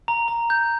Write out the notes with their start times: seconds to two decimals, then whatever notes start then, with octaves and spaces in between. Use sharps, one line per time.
0.08 A#5
0.28 A#5
0.50 G6